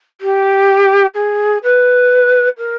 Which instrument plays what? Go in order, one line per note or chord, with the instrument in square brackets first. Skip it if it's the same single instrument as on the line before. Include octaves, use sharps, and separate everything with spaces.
[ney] G4
G#4
B4
A#4